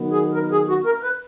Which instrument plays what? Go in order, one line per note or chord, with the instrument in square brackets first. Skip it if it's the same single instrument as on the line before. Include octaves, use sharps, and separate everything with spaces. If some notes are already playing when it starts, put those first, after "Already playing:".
Already playing: [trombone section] D#3 F#3 B3
[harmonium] G#4
A#4
G#4
F#4
A#4
B4